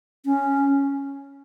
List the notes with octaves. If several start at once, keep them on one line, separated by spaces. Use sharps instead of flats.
C#4